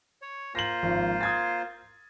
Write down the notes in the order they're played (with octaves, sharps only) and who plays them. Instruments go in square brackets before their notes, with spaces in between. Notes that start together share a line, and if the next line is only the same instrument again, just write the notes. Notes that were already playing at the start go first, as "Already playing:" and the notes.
[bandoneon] C#5
[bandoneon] A#3 F4 C5 [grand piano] A#6 F#7
[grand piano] G#1 F3
D#6 G#6 A6